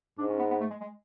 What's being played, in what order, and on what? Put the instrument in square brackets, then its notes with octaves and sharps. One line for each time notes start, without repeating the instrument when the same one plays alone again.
[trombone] G#2 [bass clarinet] D4
[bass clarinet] C#4
B3
B3
A3
G#3
G#3